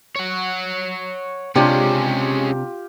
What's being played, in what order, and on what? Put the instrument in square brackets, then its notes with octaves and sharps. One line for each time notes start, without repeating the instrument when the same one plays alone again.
[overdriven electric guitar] C#5 F#5
[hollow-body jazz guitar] C3 D4 [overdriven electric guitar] G#3 C#4 [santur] F4 G4